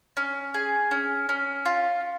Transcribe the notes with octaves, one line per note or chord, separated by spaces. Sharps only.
C#4
G#4
C#4
C#4
F4